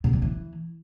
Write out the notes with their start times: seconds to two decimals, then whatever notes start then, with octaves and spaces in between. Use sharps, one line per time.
0.04 B2
0.13 G3
0.22 E3